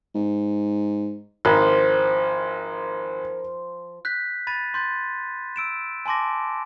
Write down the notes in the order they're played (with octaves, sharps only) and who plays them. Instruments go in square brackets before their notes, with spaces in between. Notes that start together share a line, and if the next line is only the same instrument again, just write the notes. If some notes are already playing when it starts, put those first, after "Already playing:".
[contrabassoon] G#2
[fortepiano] G#1 [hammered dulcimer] F3 [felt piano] A#4
[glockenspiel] F#6 G6 B6
B5 A6 D#7
C6 G6 A6
E6 D7 E7
G#5 A5 C6 D6 A#6